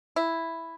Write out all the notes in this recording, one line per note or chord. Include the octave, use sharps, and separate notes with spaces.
E4